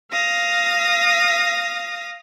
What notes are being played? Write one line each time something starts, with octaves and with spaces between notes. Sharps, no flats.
F5 D#6 A#6